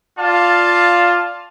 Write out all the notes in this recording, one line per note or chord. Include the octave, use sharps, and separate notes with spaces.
F4 D5 F5 A5